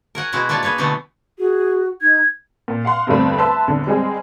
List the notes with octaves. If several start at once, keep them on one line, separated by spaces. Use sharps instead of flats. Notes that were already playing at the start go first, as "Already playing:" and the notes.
A#4 C#5 F#5 G#5
B2 G#3 E4 F#4
A#3 D4 F4 C#5 D5
A#3 G#4 B4 C#5
B2 D3 E3 F#3 A3 B3
F#4 G#4
D#4 G#6
A#2
F5 F#5 C6
E2 G2 D3 G3 A3 C4
B4 E5 A5 C6 E6
G1 E2 D3
G3 G#3 C4 G#4